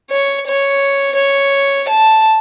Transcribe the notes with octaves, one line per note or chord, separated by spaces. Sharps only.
C#5
C#5
C#5
A5